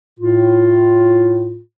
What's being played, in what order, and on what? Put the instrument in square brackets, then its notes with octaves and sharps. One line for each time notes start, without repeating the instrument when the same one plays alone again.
[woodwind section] A2 F4